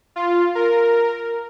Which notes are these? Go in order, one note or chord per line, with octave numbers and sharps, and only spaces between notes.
F4
A#4